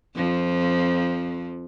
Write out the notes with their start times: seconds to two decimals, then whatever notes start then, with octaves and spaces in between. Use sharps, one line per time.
0.15 F2 F3